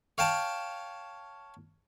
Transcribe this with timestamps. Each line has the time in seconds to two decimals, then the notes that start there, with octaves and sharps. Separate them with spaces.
0.18 C#5 F5 G5 A5